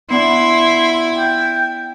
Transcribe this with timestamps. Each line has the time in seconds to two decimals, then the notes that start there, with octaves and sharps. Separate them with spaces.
0.10 B3 D4 E4 F#5 C6
1.17 G5